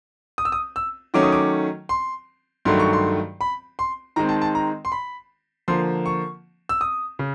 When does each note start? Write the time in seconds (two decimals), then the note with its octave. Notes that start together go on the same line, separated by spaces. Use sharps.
0.38 D#6
0.45 E6
0.52 D#6
0.76 E6
1.14 D#3 F#3 A3 C#4 D6
1.23 D#6
1.32 D6
1.89 C6
2.65 G2 D#3 F#3 A3 C6
2.79 C#6
2.93 C6
3.41 B5
3.79 C6
4.16 D#3 G#3 C4 A#5
4.29 A5
4.42 A5
4.55 A#5
4.85 C6
4.92 B5
5.68 D3 F3 A#3 C6
6.06 C#6
6.69 E6
6.81 D#6
7.19 C#3